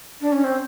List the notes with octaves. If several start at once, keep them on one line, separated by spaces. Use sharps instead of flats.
D4
C#4
C4